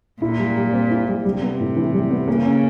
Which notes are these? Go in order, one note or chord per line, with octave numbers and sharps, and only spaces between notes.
A#2 E4
G3
G3
C4
E4
G3
C3 G3
B3
A2
E3
G3
B3
C#3 A#3
C#4